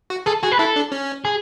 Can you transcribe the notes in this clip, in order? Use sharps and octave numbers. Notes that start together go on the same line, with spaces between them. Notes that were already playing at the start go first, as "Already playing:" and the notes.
F#4
G#4 A4
F#4 G#4
B4
E4 A4
D4
C#4
G#4